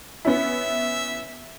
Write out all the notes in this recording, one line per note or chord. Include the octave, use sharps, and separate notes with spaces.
B3 C#4 E4 E5